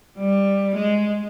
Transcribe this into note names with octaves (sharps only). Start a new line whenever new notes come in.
G3
G#3